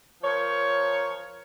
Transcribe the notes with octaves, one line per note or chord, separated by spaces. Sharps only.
F3 A#4 C#5